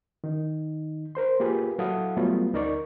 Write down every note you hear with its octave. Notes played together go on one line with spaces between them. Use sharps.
D#3 D#4
A#4 C5 C6
A#3 F4 G4 G#4 B4
F#3 E4 A4 F5 F#5 D#6
F#3 G3 A3 B3 F4
D2 D#4 A#4 D5 C#6